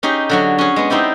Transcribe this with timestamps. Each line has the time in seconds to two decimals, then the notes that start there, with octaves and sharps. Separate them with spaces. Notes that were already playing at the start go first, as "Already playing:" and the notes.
0.03 C#4 D#4 G4 G#4
0.30 D3 F#3 F#4
0.59 C#4 G#4
0.76 G#3 B3
0.90 C4 D#4 E4 G4 D5